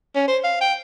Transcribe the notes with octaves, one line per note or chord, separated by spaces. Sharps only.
C#4
C5
F5
G5